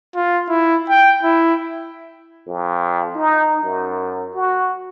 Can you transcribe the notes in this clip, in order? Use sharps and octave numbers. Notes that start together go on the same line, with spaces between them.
F4
E4
G5
E4
F2
D#4
F#2
F#4